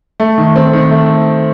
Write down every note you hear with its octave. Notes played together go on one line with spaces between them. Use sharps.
A3
D#3
C4
D#3
A3